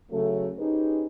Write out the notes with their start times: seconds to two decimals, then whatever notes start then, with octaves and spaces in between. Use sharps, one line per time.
0.11 C#3 F#3 A3
0.58 C#4 D#4 G4 G#4 B4 C5